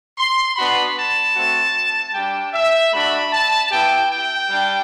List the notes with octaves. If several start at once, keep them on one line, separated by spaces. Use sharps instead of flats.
C6
B3 D4 F#4 B5
A5
A3 C4 F#4
G3 D4 G4 G5
E5
A3 D4 F#4 B5
A5
B3 E4 G4 G5
G5
G3 D4 G4